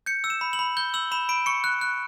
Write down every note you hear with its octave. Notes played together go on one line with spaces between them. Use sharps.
G6 C#7
E6
E7
B5
F#7
B5
G6 G7
E6 F#7
B5 E7
B5 D7
C#6 C#7
F#6
F#6